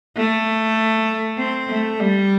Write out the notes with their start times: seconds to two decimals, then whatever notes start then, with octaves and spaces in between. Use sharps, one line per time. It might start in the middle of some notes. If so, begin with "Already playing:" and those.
0.17 A3
1.39 C4
1.70 A3
2.00 G3